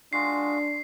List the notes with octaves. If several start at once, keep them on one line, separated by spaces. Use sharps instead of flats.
G#3 D4 F4 F#4 C7